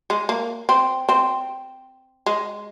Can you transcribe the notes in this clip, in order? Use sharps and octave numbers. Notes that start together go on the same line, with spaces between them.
G#3
A#3
C4
C4
G#3